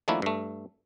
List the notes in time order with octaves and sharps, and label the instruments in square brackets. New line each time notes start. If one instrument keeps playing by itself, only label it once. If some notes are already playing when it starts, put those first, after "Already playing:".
[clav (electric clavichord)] D#3 F3 A3 A#3 D4 E4
G2 A3